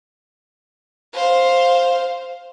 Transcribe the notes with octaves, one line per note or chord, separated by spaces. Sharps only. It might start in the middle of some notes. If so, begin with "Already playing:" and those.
C5 F5